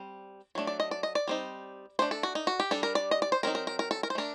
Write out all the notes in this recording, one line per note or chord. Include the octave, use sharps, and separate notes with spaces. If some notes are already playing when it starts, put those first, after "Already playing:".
Already playing: G3 C4
F#3 A3 D4
D5
D#5
D5
D#5
D5
G3 C4 D#4
A3 D4 C5
A4
F#4
D#4
F#4
G4
G3 D4 A4
A#4
D5
D#5
D5
C5
F#3 C4 D#4 A#4
A#4
A#4
A#4
A4
A#4
C5
A3 D4 A#4